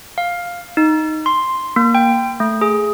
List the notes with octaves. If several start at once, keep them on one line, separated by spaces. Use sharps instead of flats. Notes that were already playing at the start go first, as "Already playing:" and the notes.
F5
D#4
C6
A#3
G5
A3
G#4